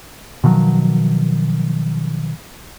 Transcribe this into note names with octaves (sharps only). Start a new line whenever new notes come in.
B2 D#3 F3 F#3